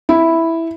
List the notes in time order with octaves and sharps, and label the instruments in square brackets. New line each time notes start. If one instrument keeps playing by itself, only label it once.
[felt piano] E4